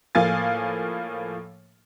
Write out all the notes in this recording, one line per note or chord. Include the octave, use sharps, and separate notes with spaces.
A2 F3 A#3 F5 G#5 A6